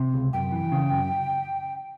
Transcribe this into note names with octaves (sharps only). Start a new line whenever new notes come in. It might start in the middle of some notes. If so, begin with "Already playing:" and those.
Already playing: C3
C#2
F#2 G5
E3
C#3
F#2